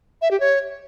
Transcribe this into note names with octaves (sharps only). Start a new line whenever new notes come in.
E5
G4
C#5